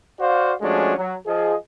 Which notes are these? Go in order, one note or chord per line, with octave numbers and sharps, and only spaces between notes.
F#4 C5 D5 F5
F3 G#3 A3 C#4 D4 F#4
F#3
F3 G#4 D#5